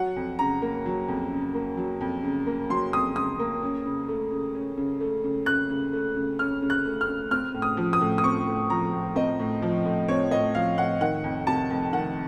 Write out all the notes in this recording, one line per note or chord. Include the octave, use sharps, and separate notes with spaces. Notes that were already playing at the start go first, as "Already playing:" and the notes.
Already playing: F#3 F#5
F2
C#3 A#5
A#3
F#3
F2
C#3
A#3
F#3
F2
C#3
A#3
F#3 C6
F2 D#6
C#3 D#6
A#3
C#4
C#3
A3
C#3
C#4
C#3
A3
C#3
C#4 F#6
C#3
A3
C#3
C#4 F6
C#3
F#6
A3
F6
C#3
C4 F6
A2
D#6
F3
D#6
A2
D#6
C4 C#6
A2
F3 A#5
A2
C4 D#5
A2
F3
A2
C4 C#5
A2 D#5
F3 F5
A2 F#5
D#3 F#5
F2
C3 A5
F2
D#3 F#5